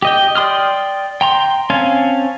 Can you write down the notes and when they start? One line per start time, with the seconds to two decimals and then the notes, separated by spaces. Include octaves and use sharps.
0.02 G4 D#5 G5
0.35 D5 G5 C6 D#6 F6
1.21 G5 A#5 C6
1.70 C4 C#4 F5 G#5 A5